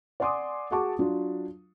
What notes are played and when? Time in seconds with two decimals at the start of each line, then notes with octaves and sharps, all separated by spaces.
0.20 D5 F#5 G#5 C6 D6 D#6
0.71 F#4 G#4 F#5 A5 C#6 D6
0.99 F#3 D4 F4